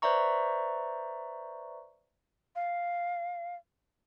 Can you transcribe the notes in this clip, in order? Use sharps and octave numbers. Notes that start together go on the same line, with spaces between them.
B4 C5 D5 E5 A#5 C#6
F5